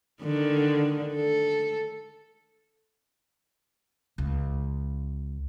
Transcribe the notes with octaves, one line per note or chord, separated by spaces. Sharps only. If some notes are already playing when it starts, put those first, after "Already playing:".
D3 D#3
A4
C#2